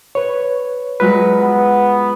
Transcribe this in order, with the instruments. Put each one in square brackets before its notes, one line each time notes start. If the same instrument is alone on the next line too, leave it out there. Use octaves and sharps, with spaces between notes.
[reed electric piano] B4 C#5
[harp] F#3 G#3 F4 [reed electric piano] B4
[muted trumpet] B3